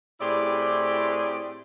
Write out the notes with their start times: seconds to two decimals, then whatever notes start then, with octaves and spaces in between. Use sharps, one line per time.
0.21 A2 C4 E4 G4 G#4 D5